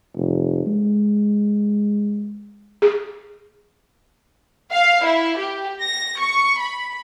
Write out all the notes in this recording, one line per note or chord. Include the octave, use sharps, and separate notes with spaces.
F1
G#3
G#4
F5
E4
G4
A#6
C#6
B5